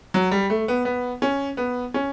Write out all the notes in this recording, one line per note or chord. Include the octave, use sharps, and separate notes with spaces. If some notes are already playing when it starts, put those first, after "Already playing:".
F#3
G3
A3
B3
B3
C#4
B3
C#4